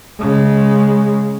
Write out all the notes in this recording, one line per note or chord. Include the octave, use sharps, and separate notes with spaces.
C#3 G#3